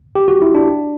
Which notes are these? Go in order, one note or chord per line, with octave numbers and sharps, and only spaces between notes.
G4
F#4
E4
D4